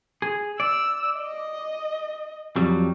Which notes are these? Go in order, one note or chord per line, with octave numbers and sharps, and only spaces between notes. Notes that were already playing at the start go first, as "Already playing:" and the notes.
G#4
D5 E6
D#5
F2 F#3 G3